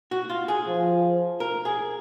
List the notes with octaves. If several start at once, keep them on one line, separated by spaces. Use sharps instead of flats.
F#4
F4
G#4
F3
A#4
G#4